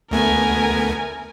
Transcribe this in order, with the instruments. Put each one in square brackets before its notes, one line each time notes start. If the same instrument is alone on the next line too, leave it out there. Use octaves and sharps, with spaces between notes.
[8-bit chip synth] D2 A3 B3 [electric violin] A#4 G#5